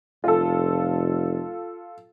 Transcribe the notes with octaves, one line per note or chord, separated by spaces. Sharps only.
F1 F4 A4